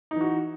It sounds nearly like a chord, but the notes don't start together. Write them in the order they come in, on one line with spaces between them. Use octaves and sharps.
D#4 E3 F#4